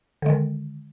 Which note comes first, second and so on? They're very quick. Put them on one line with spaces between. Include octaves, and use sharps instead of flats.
D3 G#3 D#3